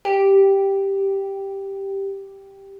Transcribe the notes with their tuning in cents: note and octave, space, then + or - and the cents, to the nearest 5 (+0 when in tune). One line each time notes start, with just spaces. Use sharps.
G4 +0